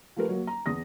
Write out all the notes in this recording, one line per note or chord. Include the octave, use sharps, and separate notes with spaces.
F3 A3 G4 A#4 B4
F#3 A#3
A#5
E2 D#6 A#6